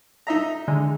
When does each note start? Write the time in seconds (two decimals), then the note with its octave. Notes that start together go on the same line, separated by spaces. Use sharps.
0.27 D#4 E5 A#5
0.68 D3 G#3